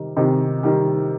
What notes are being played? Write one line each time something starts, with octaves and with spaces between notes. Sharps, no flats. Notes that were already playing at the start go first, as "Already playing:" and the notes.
Already playing: C3 D#3 G3
C3 D#3 D#4
D#3 G3